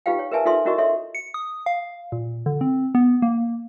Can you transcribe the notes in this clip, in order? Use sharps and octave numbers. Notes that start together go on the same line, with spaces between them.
D#4 F4 G4 B4 F5 G5
C#5
A#4 B4 E5 G#5 A5
D#4 F4 A4 B4 E5 C6
C#4 E4 F#4 A#4 D#5 C#6
A4 C#5 E5 C6
C#7
D#6
F5
A#2
D3
C4
B3
A#3